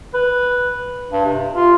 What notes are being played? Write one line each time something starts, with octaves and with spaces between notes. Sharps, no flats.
B4
G2
C3
F4